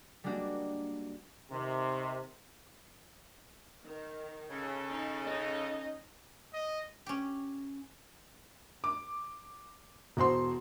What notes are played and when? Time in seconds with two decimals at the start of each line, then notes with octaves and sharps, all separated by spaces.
0.24 G3 G#3 A#3 D4 F#4 G4
1.51 C3 D#3
3.86 D#3
4.50 C#3 A4
4.88 D#4
5.25 C#4 D#4 D#5
6.54 D#5
7.06 C#4 G4
8.84 D6
10.17 E1 F#4 C5 C6